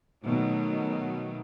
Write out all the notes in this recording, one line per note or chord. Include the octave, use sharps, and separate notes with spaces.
B2 D#3 F#3 A3